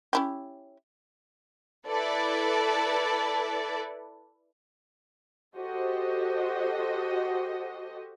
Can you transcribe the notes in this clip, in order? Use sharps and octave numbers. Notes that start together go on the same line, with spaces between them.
C#4 E4 G4
E4 A4 B4 D5
F#4 G4 A4 C5 D#5